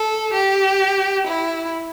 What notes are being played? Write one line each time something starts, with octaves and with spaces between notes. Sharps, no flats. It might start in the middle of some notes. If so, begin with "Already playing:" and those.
Already playing: A4
G4
E4